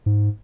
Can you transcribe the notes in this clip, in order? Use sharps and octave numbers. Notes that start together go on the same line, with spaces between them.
G#2